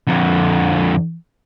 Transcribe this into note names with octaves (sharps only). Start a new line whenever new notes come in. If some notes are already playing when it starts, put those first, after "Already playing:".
F2 D3